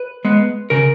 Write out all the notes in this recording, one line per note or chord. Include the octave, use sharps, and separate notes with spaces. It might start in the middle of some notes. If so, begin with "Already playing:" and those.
Already playing: B4
G#3 B3
C#3 A#4